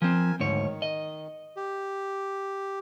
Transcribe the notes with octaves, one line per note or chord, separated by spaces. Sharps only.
F3 C4 A#4 G#5
D2 G#2 D#3 C#5
D#5
G4